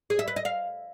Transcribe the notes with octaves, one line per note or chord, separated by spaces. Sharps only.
G#4
E5
B4
D#5
F5